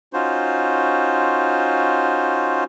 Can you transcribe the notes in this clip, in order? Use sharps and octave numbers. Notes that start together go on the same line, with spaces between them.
C#4 D#4 F4 F#4 C5